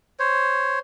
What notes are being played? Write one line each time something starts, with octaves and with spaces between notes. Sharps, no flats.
C5 C#5